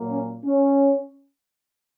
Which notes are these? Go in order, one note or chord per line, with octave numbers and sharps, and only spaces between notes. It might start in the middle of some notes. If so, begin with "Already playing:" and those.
Already playing: A#2 F#3 A#3
C#4
C#4